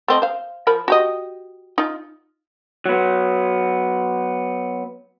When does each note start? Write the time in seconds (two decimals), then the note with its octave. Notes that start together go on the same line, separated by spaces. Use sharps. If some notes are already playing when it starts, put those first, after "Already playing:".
0.08 A3 C4 D#5
0.22 C5 F5
0.67 F3 A#4 B5
0.88 F#4 G4 D#5
1.78 D#4 F4
2.86 F#3 B3